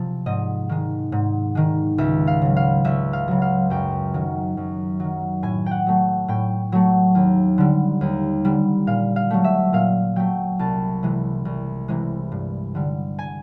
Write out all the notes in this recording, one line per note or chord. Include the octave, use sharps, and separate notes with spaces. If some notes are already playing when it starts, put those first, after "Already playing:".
Already playing: C3 F3
G#2 D#5
D#3 G#3
G#2
D#3 G#3
C#2 E5
F5
C#3 F#3
F5
C#2 E5
F5
C#3 F#3
F5
F#2 G5
D#3 F#3
F#2
D#3 F#3
A2 G#5
F#5 G5
F#3 A3
A2 G5
F#3 A3
D#2
D3 G3
D#2
D3 G3
A#2 F5
F5
F#3 A3
E5
A#2 F5
F#3 A3 G5
C2 A5
C3 E3 G#3
C2
C3 E3 G#3
G2
D3 G3
G#5